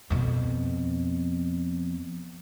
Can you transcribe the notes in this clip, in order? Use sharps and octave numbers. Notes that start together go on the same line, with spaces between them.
F2 B2